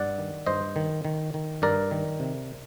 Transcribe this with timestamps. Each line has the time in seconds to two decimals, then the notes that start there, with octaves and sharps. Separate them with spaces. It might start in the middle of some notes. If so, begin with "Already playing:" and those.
Already playing: G2 D5 F#5
0.18 D#3
0.46 G2 C5 D#5
0.76 D#3
1.05 D#3
1.34 D#3
1.62 G2 A#4 D5
1.91 D#3
2.20 C3